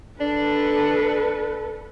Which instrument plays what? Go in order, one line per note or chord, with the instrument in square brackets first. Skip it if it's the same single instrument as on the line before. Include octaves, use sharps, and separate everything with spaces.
[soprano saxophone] D4 [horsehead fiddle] A4 B4